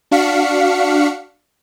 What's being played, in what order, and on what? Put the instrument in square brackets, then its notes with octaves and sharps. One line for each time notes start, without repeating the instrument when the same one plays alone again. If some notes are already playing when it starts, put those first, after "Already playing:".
[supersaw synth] D4 F#4 F5 B6 C#7